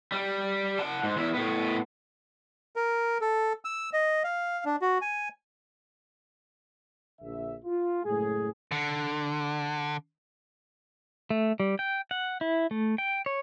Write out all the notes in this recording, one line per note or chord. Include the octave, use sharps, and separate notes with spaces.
G3
F#5 A5
G#2
E2 E4
A2 B3
A#4
A4
E6
D#5
F5
D4
F#4
G#5
A#1 D3 E5
F4
F#1 A2 G#3 G#4
D3
A3
G3
G5
F#5
E4
A3
G5
C#5